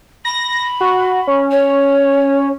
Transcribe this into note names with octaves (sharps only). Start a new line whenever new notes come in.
B5 A#6
F#4
C#4
C#5